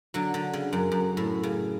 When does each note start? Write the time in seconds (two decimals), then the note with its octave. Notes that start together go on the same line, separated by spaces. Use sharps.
0.14 D3 F#3
0.34 D3
0.53 C#3
0.73 F#2
0.92 F#2
1.17 A2
1.43 C#3